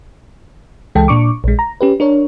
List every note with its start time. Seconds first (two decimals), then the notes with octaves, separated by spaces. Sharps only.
0.95 C#2 E3 G#3 A4 G5
1.08 A#2 D4 C#6 D6
1.44 A#1 G#3
1.59 A#5
1.81 C#4 G4 B4
2.00 D4 A#4 C#5